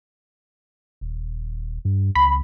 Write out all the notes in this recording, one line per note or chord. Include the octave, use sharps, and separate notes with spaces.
D#1
G2
C#2 B5